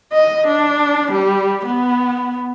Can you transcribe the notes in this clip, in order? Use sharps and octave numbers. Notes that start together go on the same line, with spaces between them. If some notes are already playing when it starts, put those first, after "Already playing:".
D#5
D4
G3
B3